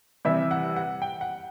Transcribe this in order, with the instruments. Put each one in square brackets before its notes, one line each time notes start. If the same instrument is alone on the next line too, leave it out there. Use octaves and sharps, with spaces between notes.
[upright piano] C3 E3 G3 E5
F#5
F#5
G5
F#5